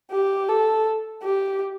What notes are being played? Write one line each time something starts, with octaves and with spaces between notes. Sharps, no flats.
G4
A4
G4